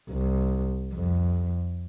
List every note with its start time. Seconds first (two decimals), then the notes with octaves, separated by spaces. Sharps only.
0.10 C2
0.94 F2